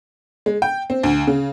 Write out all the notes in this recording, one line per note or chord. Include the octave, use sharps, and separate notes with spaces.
G#3
G5
C4
D2
C#3